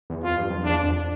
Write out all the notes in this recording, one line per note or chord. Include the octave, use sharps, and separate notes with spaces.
E2
F2 F4
G2
F2
E2 D4
F2